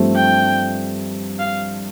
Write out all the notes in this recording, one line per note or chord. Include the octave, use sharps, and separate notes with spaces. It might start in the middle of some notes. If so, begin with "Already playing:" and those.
Already playing: G2 F3 A3 C4
G5
F5